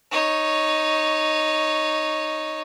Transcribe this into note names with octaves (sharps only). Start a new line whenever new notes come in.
D#4 C#5